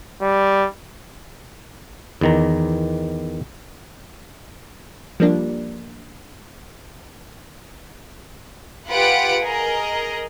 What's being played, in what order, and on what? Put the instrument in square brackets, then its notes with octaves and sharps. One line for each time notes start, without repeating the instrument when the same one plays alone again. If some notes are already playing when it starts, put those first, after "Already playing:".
[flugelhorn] G3
[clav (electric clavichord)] E2 D#3 A#5
[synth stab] F3 G3 A#3 D4
[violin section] F4 G4 B4 F#5 D7
G#4 A#4 D#5